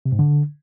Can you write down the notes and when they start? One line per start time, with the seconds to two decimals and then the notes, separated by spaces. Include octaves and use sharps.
0.06 C3
0.12 G#2
0.19 D3